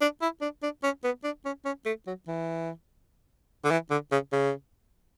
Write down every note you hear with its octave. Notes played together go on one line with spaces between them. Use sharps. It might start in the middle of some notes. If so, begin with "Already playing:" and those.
D4
E4
D4
D4
C#4
B3
D4
C#4
C#4
A3
F#3
E3
D3
E3
D3
C#3
C#3